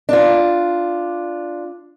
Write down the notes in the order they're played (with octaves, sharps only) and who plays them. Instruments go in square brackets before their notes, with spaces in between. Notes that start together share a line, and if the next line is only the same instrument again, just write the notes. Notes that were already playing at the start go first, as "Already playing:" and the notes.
[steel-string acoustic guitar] D4 F4